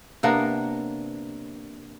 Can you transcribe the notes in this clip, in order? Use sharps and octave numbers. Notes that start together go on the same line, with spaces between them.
C3 A#3 B3 D4